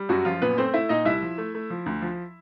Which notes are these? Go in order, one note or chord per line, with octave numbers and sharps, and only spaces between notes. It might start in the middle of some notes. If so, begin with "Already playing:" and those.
Already playing: G3
F#2 F#3 F#4
F#2 F3 F4
A#2 B3 B4
A3 C4 C5
A3 E4 E5
A#2 D#4 D#5
C2 E4 E5
F3
A3
A3
F3
D2
F3